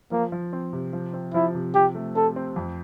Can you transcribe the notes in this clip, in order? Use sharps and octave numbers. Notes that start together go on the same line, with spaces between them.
F3 A#3
F3
C4
C3
F3
C4
F3 E4
C3
F3 G4
A3
C4 A4
C4
F2